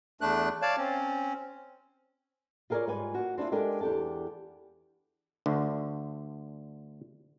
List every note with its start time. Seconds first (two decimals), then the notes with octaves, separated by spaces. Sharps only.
0.21 E2 A3 D4 F#6
0.62 C#5 D5 F5 A5
0.78 C4 C#4
2.70 F4 G#4 A#4 B4 C#5 D5
2.87 G#2 G3 F4 B4 G#5
3.14 A#3 F#4
3.38 C4 D4 E4 F4
3.52 G#3 D4 G4 A4 A#4
3.81 E2 D4 G4 A4 A5
5.46 D2 D3